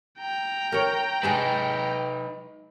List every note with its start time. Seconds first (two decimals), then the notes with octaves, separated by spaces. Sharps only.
0.20 G5 A#5
0.72 A#4 C#5
1.23 G#3 D#4 G#4 B4 A5